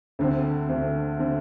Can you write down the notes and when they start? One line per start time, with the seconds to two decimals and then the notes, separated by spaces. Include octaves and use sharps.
0.19 D2 D3 C4
0.69 D2 D3 C4
1.19 D3 C4